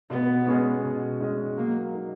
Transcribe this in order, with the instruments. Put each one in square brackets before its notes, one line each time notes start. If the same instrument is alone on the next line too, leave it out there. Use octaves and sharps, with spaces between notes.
[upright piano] B2 [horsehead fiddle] B3
[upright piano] G#3 C#4 G#4 D#5
B2
G#3 C#4 G#4 D#5
[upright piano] F#3 [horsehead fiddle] A#3
[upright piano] A#3 D#4